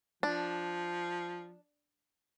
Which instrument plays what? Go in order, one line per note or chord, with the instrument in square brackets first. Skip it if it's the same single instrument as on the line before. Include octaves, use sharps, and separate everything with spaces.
[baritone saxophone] F3 [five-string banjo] D4